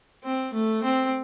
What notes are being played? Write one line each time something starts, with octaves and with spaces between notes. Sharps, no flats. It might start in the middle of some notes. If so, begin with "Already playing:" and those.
C4
A3
C4